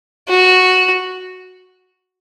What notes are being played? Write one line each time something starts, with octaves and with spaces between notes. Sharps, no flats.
F#4